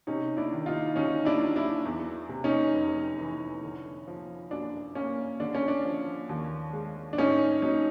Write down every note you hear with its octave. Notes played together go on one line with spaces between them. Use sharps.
C3 C#4 D#4
D4 E4
D#3
D#4 F4
D2 C#4 D#4
D4 E4
F#3
D4 E4
E2
C3
C#4 D#4
F1
E3
D3
F3
F#2 D4
A#3 C#4
D3 D4
C#4
D4
F3
D#2
G#3
D4
A2 C#4 D#4
F#3 C#4 D#4